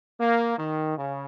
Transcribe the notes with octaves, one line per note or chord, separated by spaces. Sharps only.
A#3
D#3
C#3